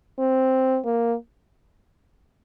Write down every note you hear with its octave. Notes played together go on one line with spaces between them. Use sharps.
C4
A#3